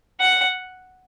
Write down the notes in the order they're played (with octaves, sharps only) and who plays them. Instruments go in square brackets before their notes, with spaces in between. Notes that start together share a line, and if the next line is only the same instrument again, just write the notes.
[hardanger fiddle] F#5